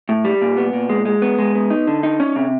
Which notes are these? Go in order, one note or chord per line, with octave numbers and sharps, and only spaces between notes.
A2
G3
A#2
B3
A#2
G#3
G#3
B3
G#3
B3
D#4
D3
D#4
C#4
C3